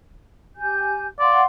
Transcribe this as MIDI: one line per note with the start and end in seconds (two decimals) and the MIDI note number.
0.56 1.07 67
0.56 1.07 80
0.56 1.07 91
1.20 1.43 74
1.20 1.45 77
1.20 1.45 78
1.20 1.45 84